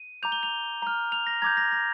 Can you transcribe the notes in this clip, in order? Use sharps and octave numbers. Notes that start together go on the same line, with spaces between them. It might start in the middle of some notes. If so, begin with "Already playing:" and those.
Already playing: D#7
A#5 D6 G6 F7
G7
F7
A#5 F6
F7
A#6
A#5 D6 G6 G#6
A#6
A#6